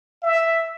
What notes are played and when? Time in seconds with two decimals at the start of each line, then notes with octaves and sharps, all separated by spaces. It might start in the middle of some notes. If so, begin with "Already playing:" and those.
0.23 E5